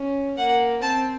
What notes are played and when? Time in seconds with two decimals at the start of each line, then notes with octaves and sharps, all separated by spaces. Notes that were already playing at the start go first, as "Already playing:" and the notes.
Already playing: C#4
0.37 A#3 F#5
0.82 C4 A5